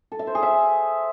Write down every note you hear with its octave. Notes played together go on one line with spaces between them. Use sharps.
A4
E5
C5
G#4
E5